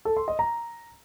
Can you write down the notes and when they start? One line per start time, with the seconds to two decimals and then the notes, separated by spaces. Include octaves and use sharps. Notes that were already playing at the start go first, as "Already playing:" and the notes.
0.05 A4
0.17 C6
0.28 D#5
0.39 A#5